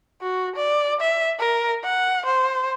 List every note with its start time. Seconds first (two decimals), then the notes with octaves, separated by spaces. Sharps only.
0.22 F#4
0.56 D5
1.01 E5
1.40 A#4
1.84 F#5
2.26 C5